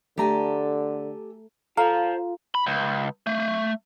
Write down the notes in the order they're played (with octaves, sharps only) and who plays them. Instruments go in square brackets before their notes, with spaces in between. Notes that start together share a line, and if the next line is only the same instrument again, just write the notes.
[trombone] D3 [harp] A3 A#5 [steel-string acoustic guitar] G4 A4 G#5
[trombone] F4 [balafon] A4 [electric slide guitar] C5 F5 [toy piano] A#5
[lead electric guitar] B5
C#2
A3
A3